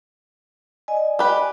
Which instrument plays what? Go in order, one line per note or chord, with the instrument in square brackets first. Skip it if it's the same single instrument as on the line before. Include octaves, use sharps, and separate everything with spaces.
[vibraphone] D5 D#5 G#5
[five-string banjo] G4 B4